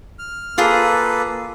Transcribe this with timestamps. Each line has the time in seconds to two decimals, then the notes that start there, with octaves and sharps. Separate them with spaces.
0.19 F6
0.58 A#3 F4 G#4 A4 B4